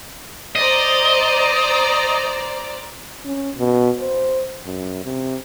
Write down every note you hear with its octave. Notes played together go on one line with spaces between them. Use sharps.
C5 D5 D#5 A#5
C#4
B2
C5
F#2
C3